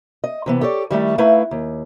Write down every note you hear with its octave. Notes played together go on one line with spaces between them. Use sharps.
D#5
C3 E3 B3
G4 A4 C#5 D5
D#3 G3 A3 E4
A3 D#4 E4 B4 E5 F5
D#2